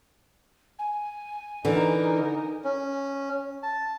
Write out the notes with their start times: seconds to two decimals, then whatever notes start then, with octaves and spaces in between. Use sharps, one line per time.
0.79 G#5
1.65 D3 E3 D#4 A#4
2.64 C#4
3.63 A5